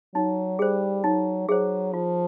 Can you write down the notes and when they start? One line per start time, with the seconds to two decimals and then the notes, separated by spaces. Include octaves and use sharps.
0.15 F#3 D#4
0.59 G3 G#4 C5
1.04 F#3 D#4
1.48 F#3 G#4 C5
1.93 F3 F4